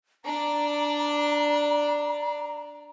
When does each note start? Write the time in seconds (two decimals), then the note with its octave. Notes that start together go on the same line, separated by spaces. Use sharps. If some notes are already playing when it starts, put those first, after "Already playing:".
0.25 D4 D5 A#5